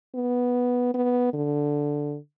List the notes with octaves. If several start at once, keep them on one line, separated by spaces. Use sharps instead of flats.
B3
B3
D3